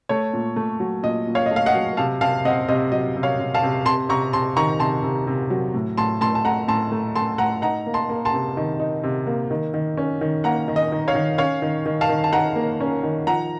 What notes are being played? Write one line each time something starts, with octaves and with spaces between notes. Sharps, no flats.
A3 C#5
A#2
A3
F#3
A#2 D#5
A#2
C#5 F5
D#5
A3
F5
D#5 F#5
F#3
C3 F5 A5
C3 F5 A5
C4 D#5 F#5
C3 D#5
F#3 D#5
C3
C#5 F5
C3
F5 A5
C3
C3 A5 C6
C3 A#5 C#6
C3 A5 C6
D#3 A#5 C#6
C3 A5 C6
C3
C3
F#3
A2
A2 A5 C6
A2 A5 C6
A5
A3 F#5 A#5
A2 A5 C6
A3
A3 A5 C6
A2 F#5 A#5
D#4 F#5 A#5
A#3
A5 C6
A#3
A5 C6
C3
D#3
D#4
C3
A#3
D#3
D#3
C#4
D#3
A#3 F#5 A#5
D#3
D#5
D#3
C#5 F5
D#3
C#4 C#5 F5
D#3
D#3
F5 A5
D#3
A5
D#3 F#5 A#5
A#3
C#4
D#3
F3 F#5 A#5